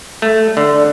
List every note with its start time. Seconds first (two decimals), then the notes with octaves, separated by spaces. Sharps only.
0.22 A3
0.57 D3